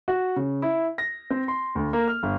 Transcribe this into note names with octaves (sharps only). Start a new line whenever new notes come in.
F#4
C#3
E4
A#6
C4
C6
D2
A#3
F6
G1